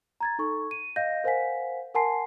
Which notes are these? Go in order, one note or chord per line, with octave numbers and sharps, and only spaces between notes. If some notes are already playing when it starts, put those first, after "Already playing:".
A#5 G#6 A6
D#4 A4 C#6
D#7
D#5 F5 G6 A#6
A#4 C5 F5 F#5 G#5 B6
A#4 F#5 G#5 A5 C6 C7